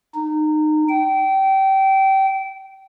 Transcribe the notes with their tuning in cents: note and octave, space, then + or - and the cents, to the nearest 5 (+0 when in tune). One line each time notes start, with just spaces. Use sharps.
D#4 -25
G5 -25